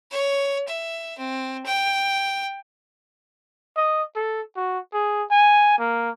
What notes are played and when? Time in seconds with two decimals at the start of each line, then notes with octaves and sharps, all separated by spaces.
0.11 C#5
0.68 E5
1.18 C4
1.66 G5
3.77 D#5
4.16 A4
4.56 F#4
4.93 G#4
5.31 G#5
5.79 A#3